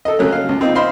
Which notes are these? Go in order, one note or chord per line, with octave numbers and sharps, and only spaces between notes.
A4 D#5
C#3 F#3 A3 C#4
F5
C#2
C4 D#4 F4
C5 D#5 F5 B5 C6